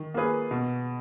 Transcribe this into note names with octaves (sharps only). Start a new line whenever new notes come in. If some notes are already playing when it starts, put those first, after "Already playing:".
Already playing: D#3
A#3 F4 G#4 B4
B2